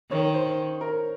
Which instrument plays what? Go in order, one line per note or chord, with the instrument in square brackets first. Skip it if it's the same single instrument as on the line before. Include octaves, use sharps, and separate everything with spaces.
[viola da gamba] D#3 [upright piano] C#5
[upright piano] C5
A#4